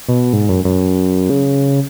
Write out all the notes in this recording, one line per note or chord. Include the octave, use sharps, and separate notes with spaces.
B2
G#2
F#2
F#2
C#3